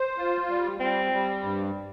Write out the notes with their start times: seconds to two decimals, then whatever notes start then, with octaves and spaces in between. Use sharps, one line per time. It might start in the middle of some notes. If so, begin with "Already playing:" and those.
Already playing: C5
0.18 F4
0.49 G3
0.80 G3 C4
1.12 G3
1.43 G2